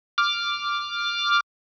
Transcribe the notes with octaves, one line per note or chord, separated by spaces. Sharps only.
D6 F6